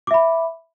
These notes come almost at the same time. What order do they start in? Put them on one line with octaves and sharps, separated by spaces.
D6 E5 B5